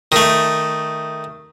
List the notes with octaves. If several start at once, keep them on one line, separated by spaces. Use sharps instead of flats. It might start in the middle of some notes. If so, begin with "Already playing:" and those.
D#3 A3